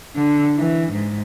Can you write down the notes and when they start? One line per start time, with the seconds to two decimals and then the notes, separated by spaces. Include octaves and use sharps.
0.15 D3
0.58 E3
0.92 G#2